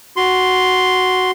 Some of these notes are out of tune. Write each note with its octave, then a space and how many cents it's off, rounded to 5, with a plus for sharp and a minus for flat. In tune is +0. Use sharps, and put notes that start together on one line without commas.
F#4 +0 C6 +0